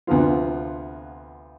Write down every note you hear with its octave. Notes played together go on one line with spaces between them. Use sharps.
D2 C3 F3 B3 F4